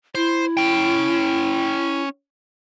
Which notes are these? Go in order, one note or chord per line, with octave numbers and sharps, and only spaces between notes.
E4 C5
C#4 G5